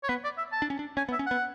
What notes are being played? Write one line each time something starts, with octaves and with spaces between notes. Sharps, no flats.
C#5
B3 B4
D5
E5
A5
D4
C#4
D4
C#4 G#5
B3
E5
C#4
B3 F#5